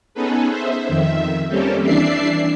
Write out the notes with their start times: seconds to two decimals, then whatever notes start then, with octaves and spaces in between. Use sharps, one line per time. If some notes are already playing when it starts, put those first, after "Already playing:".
0.14 B3 C#4 D#4 G#4 A4 B4
0.48 C5 E5
0.88 F2 D#3 E5
1.49 G3 A#3 C4 C#4 G4 A4
1.82 E3 D4 D5 E5 C7